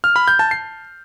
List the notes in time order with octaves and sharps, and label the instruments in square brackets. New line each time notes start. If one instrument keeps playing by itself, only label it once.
[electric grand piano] F6
B5
G6
A5
C7